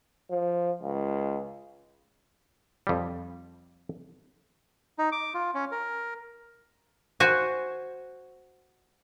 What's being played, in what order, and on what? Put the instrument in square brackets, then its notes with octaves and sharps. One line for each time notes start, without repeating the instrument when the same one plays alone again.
[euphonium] F3
C#2
[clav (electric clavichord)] F2 G3
[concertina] D#4
D6
F4
C#4
A#4
[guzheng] F#4 C5 G#5